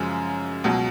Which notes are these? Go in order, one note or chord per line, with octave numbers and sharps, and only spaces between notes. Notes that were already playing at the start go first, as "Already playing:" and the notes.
Already playing: F#2 C#3 F3 G#3 C#4
C#2 B2 F#3